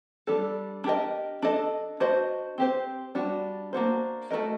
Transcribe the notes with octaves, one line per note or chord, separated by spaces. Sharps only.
G3 D4 A4
D4 G4 A#4 D#5
D4 A4 D#5
D4 F#4 C5 D#5
C4 G4 C5
G3 D4 F#4
A#3 D4 F#4 C5
A3 D4 F#4 A#4 D#5